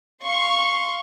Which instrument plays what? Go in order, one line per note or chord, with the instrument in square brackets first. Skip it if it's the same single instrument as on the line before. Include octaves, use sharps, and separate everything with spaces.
[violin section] F5 C6 C#6